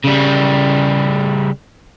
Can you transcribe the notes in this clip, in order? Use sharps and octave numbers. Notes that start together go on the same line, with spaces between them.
C#3 G3